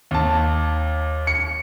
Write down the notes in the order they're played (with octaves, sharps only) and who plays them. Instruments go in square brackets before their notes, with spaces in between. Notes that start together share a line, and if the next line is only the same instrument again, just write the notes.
[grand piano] D#2 A5
C#7